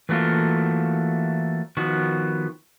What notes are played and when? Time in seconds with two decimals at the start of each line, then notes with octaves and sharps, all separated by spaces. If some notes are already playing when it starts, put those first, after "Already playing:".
0.09 E3 F#3 A3 A#3 F4
1.77 D#3 F3 B3 F#4